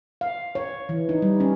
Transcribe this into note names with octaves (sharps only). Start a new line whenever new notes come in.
F5
C#5
E3
D#4
G3
C#4